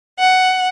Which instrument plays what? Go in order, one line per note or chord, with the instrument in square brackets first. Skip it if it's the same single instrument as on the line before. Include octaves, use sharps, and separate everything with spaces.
[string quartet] F#5